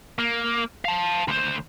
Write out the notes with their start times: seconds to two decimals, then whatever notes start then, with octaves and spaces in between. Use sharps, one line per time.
0.19 A#3
0.85 F5 A5
1.28 D2 C5